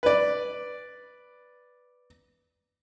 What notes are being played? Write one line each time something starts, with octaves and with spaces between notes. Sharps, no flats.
B4 D5